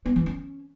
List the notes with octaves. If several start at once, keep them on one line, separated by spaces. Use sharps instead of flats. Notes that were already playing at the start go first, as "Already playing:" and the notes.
B3
E3
C#4